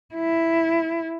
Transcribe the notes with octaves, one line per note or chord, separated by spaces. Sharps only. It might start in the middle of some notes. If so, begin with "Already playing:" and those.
E4